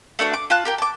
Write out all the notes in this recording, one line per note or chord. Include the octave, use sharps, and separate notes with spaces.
A3 D4 F#4 B4
D6
F4 A5 F#6
G4 A#4 G5
A5 D6